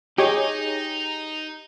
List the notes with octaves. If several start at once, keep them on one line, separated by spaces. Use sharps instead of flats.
D#4 G4 G#4 C#5 D#5